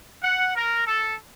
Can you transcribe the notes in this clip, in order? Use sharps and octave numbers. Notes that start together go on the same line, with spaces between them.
F#5
A#4
A4